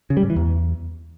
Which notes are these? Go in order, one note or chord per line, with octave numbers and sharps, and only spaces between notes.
C#3
G3
G#2
E3
E2